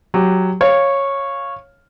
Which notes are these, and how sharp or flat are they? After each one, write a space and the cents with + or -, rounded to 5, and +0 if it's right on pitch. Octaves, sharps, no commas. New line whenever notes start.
F#3 +0 G4 +5
C#5 -10 F5 +0